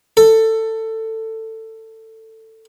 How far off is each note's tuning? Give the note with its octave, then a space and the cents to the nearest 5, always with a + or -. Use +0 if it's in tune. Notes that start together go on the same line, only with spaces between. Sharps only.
A4 +15